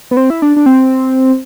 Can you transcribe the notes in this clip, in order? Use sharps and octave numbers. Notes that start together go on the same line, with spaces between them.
B3
C4
E4
D4
D4
C4